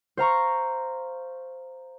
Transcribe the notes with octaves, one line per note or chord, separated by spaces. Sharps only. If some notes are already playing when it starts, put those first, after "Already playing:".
C5 F5 A#5 C#6